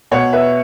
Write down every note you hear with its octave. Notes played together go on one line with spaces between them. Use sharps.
B2 C#5 F#5
B4 E5